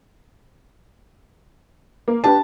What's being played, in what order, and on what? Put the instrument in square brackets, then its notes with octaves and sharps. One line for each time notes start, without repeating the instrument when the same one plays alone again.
[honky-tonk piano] A#3
[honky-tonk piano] D4 G4 B4 [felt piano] A5